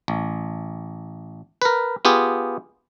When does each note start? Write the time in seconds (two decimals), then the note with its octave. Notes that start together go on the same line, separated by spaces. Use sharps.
0.08 A1
1.62 A#4 B4
2.05 B3 F4 G4 G#4